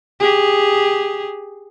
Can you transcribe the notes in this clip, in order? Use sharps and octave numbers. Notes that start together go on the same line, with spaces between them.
G4 G#4